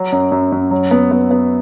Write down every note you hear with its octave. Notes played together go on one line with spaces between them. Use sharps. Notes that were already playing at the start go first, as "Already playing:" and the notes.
Already playing: F#3
F#2
F#2
F#2
F#3
B3
B3
B3